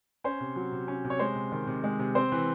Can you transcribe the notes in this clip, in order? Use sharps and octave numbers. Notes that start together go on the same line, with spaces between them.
C#4 C5
C3
F#3
C3
C#4
C3
C#5
G#3 C5
C3
D#3
C3
G#3
C3
C4 C5
E3